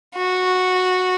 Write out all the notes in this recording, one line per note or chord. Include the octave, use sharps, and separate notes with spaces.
F#4